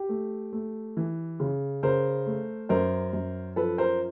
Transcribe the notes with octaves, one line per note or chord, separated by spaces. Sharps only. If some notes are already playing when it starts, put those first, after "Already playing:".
Already playing: G4
A3
A3
E3
C#3
C#3 A#4 C5
A3
F#2 A#4 C5
F#2
F3 A4 B4
A#4 C5